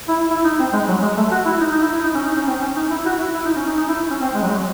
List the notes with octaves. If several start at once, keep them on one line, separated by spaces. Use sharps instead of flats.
E4
E4
D#4
C4
G#3
F#3
G#3
A3
F#4
E4
D#4
D#4
E4
E4
D#4
C#4
D#4
C#4
C4
C#4
D#4
E4
E4
F#4
E4
E4
D#4
C#4
D#4
D#4
E4
C#4
C4
G#3
F#3
G#3
F#3